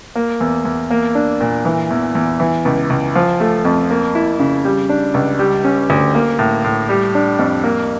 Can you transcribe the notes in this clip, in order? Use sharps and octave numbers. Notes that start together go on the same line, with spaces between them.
A#3
E2
E2
A#3
D4
A#2
E3
E2
E2
E3
C#2
C#2
F3
A3
F2
A#3
E4
C#3
G3
D4
C#2
G3
C#4
D2
A#3
A2
A2
G3
D4
F2
A#3